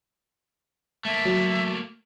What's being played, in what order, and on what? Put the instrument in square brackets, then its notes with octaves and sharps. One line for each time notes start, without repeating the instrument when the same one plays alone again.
[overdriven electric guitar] A3 A#3 [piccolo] E5
[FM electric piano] F#3